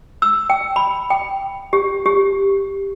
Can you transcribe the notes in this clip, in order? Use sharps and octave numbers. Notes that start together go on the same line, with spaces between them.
E6
G5
B5
G5
G4
G4